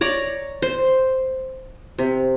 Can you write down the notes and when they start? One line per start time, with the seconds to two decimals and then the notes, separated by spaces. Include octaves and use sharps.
0.01 C#5 D5 A#5
0.62 C5
1.99 C3